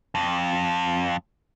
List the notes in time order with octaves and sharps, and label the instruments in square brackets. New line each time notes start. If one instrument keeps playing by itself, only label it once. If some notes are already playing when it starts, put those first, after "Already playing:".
[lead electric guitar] F2